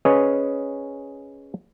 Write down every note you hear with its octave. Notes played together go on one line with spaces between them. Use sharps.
C#4 G#4 B4 C#5 D#5